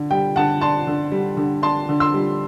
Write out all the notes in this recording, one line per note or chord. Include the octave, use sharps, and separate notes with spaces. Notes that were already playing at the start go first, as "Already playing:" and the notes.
Already playing: D3
G3 G5
D3 F#5 A5
D4 A5 C6
D3
G3
D3
D4 A5 C6
D3
C6 E6
G3